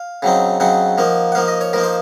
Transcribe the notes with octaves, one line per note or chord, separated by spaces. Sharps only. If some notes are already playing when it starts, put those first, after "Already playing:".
Already playing: F5
C#3 F#3 C4 D#4
C#3 F#3 C4 D#4 F#5
F3 A#3 D#4
F#5
F3 A#3 D#4 F5
D#5
C#5
F3 A#3 D#4 A#4
C5